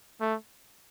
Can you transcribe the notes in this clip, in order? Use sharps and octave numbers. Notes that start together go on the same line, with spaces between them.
A3